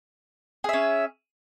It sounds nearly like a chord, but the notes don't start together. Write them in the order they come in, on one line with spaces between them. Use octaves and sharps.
G#4 E5 C#4